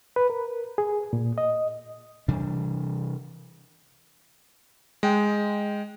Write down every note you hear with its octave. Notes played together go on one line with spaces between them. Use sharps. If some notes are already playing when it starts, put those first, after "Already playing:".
B4
A#4
G#4
A#2
D#5
C3 E3 G3 D4
G#3 G5